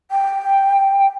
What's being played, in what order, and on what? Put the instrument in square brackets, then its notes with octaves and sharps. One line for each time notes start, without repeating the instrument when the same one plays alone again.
[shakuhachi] G5